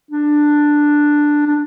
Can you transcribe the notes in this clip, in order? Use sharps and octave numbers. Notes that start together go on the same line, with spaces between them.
D4
D4